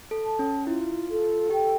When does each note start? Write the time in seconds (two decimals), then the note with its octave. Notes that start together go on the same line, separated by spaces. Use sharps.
0.11 A4
0.25 A5
0.39 C#4
0.67 E4 F4
1.09 A4
1.50 G4 G5